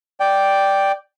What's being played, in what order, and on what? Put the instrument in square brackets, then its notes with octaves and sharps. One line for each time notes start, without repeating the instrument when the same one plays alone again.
[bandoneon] D5 G5